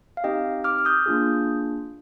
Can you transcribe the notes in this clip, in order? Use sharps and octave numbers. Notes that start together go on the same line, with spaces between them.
F5
C4 D#4 G4 D#5 G5
D6 F6
F6
D#6 G6
A#3 D4 F4 G#4